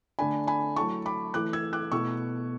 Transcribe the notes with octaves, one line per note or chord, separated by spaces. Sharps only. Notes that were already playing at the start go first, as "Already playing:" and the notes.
D3 A3 D4 G#5 B5
G#5 B5
F#3 A3 E4 A5 C#6
B5 D6
E3 A3 E4 D6 F#6
E6 G#6
D6 F#6
B2 A3 E4 C#6 E6